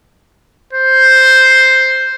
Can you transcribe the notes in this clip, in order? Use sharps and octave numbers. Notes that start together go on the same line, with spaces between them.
C5